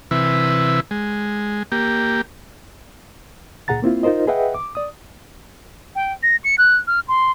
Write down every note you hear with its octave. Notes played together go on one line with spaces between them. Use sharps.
C3 E3 E4 B4
G#3
A#3 G4
C#2 A#2 G#4 F#5 A#5 A6
A#3 C4 E4 F4
D#4 F4 A#4 C5 D#5
G#4 B4 D#5 E5 F#5 G5
D6
D5 D#6
G5
A#6
C#7
F#6
F6
C6